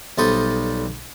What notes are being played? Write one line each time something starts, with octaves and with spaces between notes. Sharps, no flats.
B1 G3 A4 C5 D#6